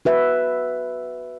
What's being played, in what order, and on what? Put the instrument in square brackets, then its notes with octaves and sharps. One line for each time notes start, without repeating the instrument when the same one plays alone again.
[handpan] F#4 B4 E5